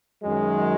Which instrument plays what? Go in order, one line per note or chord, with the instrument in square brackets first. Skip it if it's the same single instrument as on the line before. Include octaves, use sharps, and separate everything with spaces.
[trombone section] F#2 D#3 F#3 G#3